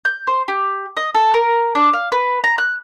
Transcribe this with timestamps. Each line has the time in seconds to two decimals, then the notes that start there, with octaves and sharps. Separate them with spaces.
0.05 G6
0.27 C5
0.48 G4
0.97 D#5
1.15 A4
1.34 A#4
1.75 D4
1.93 F5
2.12 B4
2.44 A#5
2.58 F#6